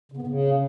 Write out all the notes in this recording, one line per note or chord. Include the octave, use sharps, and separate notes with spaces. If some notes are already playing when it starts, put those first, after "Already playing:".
C#3
B3
A2
C#3